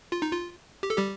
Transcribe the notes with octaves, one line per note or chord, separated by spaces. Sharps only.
F4
D#4
F4
G4
A4
G3 G4